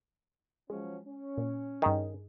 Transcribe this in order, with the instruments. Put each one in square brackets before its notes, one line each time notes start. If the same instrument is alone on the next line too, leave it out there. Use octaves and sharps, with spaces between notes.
[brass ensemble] F3 F#3 C#4 [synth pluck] G#3
[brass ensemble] C#4
[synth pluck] A#2
[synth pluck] G2 D#4 G#4 [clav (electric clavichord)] D#3